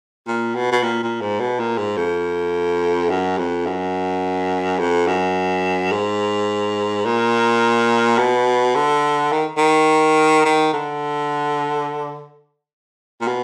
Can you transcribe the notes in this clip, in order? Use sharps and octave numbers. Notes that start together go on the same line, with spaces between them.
A#2
B2
B2
A#2
A#2
G#2
B2
A#2
G#2
F2
F#2
F2
F#2
F2
F#2
G#2
A#2
B2
D3
D#3
D#3
D#3
D3
A#2
B2